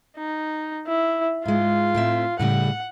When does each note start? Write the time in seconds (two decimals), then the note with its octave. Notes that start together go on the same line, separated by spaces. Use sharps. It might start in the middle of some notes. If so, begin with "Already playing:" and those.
0.17 D#4
0.87 E4
1.45 G#2 G#3 F4
1.95 A2 C4 E5
2.39 A2 C#3 G3 F#5